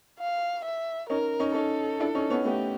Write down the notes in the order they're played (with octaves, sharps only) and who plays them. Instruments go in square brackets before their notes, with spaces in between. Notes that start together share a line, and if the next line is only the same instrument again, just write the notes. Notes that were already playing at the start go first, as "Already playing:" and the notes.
[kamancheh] F5
E5
[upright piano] C#4 D#4 [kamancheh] A#4
[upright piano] C#4 D#4
[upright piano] C#4 D#4 [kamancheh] A4
[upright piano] D4 E4
C#4 D#4
B3 C#4
[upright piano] A3 B3 [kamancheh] G4